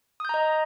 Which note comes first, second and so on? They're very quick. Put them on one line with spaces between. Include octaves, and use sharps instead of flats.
D#6 G6 A#5 D#5